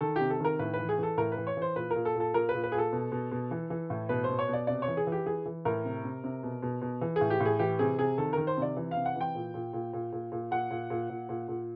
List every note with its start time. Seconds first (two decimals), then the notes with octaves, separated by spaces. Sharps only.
0.01 D#3 A4
0.16 C3 G4
0.30 A4
0.40 D#3 A#4
0.59 A2 B4
0.74 B4
0.79 E3
0.89 G#4
0.98 E3 A4
1.17 A2 A#4
1.32 B4
1.37 E3
1.47 C#5
1.57 E3 C5
1.76 A#2 B4
1.91 A#2 A#4
2.05 A4
2.15 A#2
2.20 A4
2.34 A#2 A#4
2.49 B4
2.54 A#2
2.63 B4
2.72 A#2 G#4
2.78 A4
2.93 B2
3.12 B2
3.32 B2
3.51 E3
3.70 E3
3.90 A2
4.09 B2 B4
4.24 C5
4.29 B2
4.39 C#5
4.48 B2
4.53 D5
4.67 C3 D5
4.82 C#5
4.88 E3
4.97 G#4
5.07 E3
5.12 G4
5.26 E3 G#4
5.46 E3
5.65 A2 A#4
5.85 C3
6.04 C3
6.24 C3
6.43 B2
6.63 B2
6.82 B2
7.01 E3
7.16 G#4
7.21 A2
7.30 G4
7.40 A2 G#4
7.59 E3 G4
7.79 C3 G#4
7.98 C3 G#4
8.18 D#3 A4
8.33 D#3 A#4
8.47 C5
8.57 C3 D5
8.76 E3
8.91 F5
8.96 C3
9.06 F#5
9.15 E3
9.21 G5
9.35 A#2
9.54 A#2
9.73 A#2
9.93 A#2
10.13 A#2
10.32 A#2
10.51 A#2 F#5
10.71 A#2
10.90 A#2
11.10 A#2
11.29 A#2
11.48 A#2